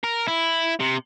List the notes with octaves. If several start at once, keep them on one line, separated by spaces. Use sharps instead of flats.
A#4
E4
C3